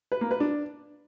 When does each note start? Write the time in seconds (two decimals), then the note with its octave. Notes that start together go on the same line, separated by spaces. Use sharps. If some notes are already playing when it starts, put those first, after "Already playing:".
0.12 B4
0.21 A#3
0.31 B4
0.40 D4